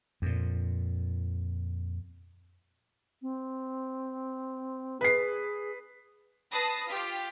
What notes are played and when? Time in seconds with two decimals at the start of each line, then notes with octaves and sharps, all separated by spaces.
0.22 F2 A#2
3.22 C4
5.01 G#4 B4 C7
6.51 B4 A5 D#6 A#6 C7
6.88 F4 G4 B6